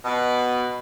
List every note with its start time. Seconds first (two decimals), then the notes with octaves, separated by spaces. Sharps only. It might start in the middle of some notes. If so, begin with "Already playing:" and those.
0.04 B2